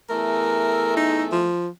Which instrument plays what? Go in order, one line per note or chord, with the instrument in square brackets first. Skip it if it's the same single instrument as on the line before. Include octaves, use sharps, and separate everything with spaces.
[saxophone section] E2 A3 [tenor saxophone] A#4
[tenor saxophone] D#4
F3